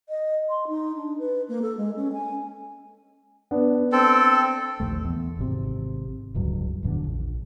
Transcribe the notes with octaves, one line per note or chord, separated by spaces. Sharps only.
D#5
C6
D#4
D4
B4
A#3
A4
G#3
C#4
G#5
B3 D4
C4 A4
A#1 D#2 A3
E2
G#1 C3
D1 C#2 G2 F#3
D1 E2 D3 D4
A#1